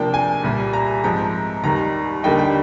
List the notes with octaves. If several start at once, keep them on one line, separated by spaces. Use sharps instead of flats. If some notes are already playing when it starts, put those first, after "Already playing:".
Already playing: C3 F3 A#3 D4 G5
G#5
C2 A#2 G3
A#5
G#2 F3 C4 A#5
D#2 D#3 G3 A#5
D#2 D3 G3 A#3 D#4 G5
G5